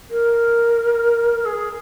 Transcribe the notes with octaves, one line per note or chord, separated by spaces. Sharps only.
A#4
G#4